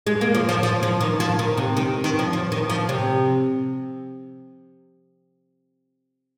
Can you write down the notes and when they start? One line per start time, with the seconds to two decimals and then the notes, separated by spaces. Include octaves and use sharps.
0.07 G#3
0.21 A#3
0.35 F3
0.49 F3
0.63 F3
0.83 F3
1.01 D#3
1.20 F3
1.39 D#3
1.57 C3
1.77 D#3
2.04 D#3
2.19 F3
2.33 F3
2.52 D#3
2.70 F3
2.89 C3